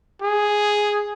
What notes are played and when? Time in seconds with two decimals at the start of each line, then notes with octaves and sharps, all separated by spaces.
0.22 G#4